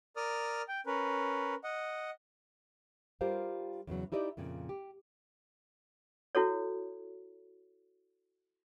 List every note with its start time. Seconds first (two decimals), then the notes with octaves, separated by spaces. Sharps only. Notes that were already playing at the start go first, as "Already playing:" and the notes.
0.16 A#4 D5 D#6 F6
0.68 G5
0.86 C#4 A#4 B4
1.64 D#5 F#5
3.21 G3 F4 G4 A#4 C5 F5
3.87 E2 C#3 F#3
4.12 D#4 E4 G4 D5 D#5
4.37 F2 A#2 C#3
4.69 G4
6.35 E4 F#4 A4 C#5